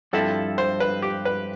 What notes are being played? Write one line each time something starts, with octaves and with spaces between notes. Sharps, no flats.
G2 F3 C4 E4 A4
C5
B4
G4
B4